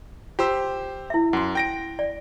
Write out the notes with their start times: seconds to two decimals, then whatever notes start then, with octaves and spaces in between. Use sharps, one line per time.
0.39 F4 G4 C5 E6
1.10 E4 E5
1.33 F#2 F#5 C6
1.55 G5 A#6 D7
1.99 D5